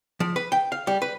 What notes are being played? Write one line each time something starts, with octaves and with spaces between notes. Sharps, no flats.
F3
B4
G5
F5
G3
B4